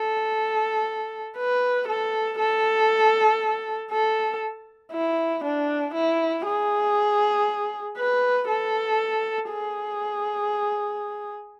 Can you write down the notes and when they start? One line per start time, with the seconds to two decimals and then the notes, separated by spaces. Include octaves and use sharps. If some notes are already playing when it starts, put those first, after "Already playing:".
Already playing: A4
1.37 B4
1.87 A4
2.39 A4
3.91 A4
4.92 E4
5.43 D4
5.94 E4
6.45 G#4
7.97 B4
8.48 A4
9.50 G#4